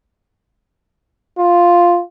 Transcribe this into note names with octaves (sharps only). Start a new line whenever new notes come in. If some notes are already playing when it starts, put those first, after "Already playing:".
F4